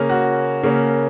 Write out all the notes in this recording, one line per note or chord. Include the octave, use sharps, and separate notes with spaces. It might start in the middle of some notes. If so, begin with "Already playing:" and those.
Already playing: C#3 A#3 C#4
F#4
C#3 A#3 C#4